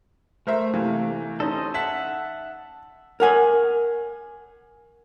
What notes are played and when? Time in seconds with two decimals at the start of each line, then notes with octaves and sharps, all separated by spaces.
0.47 A3 A#4 C5 E5
0.74 C3 E3 A#3
1.40 C#4 D#4 A4 C5 D#5
1.74 E5 F#5 A5 B6
3.20 A#4 F#5 G#5